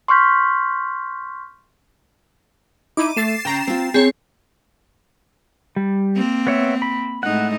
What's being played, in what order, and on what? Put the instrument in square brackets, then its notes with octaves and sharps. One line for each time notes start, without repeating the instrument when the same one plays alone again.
[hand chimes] C6 C#6 F6 G6 B6
[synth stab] D#4 E4 [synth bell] D6 D#7
[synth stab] A3 [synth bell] A6 C7 E7
[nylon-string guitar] C#3 [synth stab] G5 A#5
[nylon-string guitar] C4 F4
[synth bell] C4 C#5 [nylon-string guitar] G#4
[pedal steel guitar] G3
[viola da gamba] A#3 C4
[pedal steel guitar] B3 C#5 E5
B5
[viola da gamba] A2 G#3 D#4 [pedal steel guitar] F#5